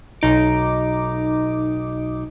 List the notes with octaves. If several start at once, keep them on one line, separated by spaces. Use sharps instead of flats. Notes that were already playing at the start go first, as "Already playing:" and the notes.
B1 D#4 D6